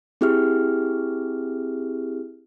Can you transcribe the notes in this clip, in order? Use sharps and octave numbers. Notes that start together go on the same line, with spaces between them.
C4 E4 G4 G#4 E5 F6